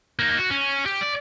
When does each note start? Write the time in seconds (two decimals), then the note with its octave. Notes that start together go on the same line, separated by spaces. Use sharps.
0.19 A#3 D#4
0.38 F#4
0.50 C#4
0.86 G4
1.01 D5